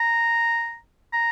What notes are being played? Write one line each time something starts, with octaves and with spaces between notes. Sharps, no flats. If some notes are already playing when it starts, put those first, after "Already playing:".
Already playing: A#5
A#5